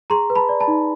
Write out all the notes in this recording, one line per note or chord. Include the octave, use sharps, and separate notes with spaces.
G#4 A#5 C6
B4
A5 B5
D5
A5 B5
D#4